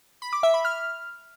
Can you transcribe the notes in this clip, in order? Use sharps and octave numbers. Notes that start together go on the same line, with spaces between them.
B5
D6
E5
B5
F6